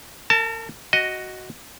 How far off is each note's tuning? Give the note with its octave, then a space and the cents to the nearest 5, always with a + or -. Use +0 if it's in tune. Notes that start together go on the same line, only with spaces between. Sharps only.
A#4 -40 A5 +5
F#4 +5 D#5 +0